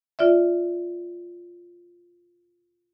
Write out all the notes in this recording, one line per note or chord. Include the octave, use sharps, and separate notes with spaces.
F4 D5 E5